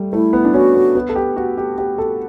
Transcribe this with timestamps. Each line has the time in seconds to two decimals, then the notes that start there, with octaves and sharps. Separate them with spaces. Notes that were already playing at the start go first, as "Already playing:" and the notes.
Already playing: G3 A3
0.13 A3 E4
0.33 B3
0.45 D4
0.54 C#4 F#4
0.75 B3
0.95 B3
1.09 A4
1.16 G4
1.36 F#4
1.58 G4
1.78 G4
1.98 A4